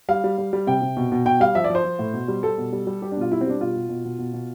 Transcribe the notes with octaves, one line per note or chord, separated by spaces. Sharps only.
G3 F5
G3
G3
G3
C3 G5
C3
B2
B2
B2 G5
G3 F5
F3 E5
D5
F3
C5
F3
A2
B2
G3
G3 A4
B2
G3
G3
G3 G4
D4
B2 F4
G3 E4
C4
G3 D4
B2 F4
B2
B2
B2
B2
B2